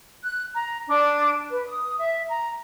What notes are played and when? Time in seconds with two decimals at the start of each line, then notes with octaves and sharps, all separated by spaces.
0.24 F#6
0.53 A#5
0.88 D4
1.51 B4
1.67 D#6
1.98 E5
2.28 A#5